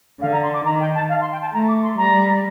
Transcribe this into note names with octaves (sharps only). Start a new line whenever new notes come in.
D3 F5
A#5
C6
D6
D#3 A#5
G5
A5
F5
C6
G5
A5
A3 A#5
D6
C6
G3 A#5